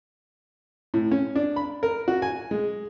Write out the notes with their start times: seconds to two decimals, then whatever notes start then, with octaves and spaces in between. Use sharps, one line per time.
0.94 A2
1.11 C#4
1.36 D4
1.56 B5
1.83 A#4
2.08 F#4
2.22 G#5
2.51 G#3